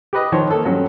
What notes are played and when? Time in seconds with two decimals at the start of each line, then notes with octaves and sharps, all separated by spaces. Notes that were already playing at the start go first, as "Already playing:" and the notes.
0.13 G4 B4 D#5
0.32 D#3 F3 C5 C#5
0.50 A#3 A4
0.65 G2 F#3 C#4